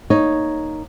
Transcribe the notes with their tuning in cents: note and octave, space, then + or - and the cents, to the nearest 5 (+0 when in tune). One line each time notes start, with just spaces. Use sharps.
A#3 +0 D#4 +0 C#5 +0